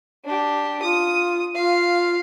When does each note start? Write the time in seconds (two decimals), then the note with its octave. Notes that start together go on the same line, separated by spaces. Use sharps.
0.24 D4 G4
0.82 F4 D#6
1.55 F4 F5